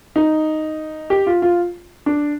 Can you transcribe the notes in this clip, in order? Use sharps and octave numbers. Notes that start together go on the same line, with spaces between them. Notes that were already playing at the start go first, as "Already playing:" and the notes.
D#4
G4
F4
F4
D4